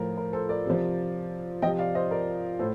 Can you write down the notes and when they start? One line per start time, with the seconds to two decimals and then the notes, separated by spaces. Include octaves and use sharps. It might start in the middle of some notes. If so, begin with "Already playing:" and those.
Already playing: A2 F3 A#4
0.17 A#4
0.33 A4 C5
0.49 A#4 D5
0.66 C3 F3
1.62 F3 D#5 G5
1.66 C3
1.79 D5 F5
1.95 C5 D#5
2.11 A#4 D5
2.59 A2 A4 C5